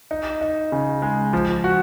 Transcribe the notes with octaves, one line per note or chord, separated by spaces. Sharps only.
D#4
D#4
C#3
G#3
F3
F#4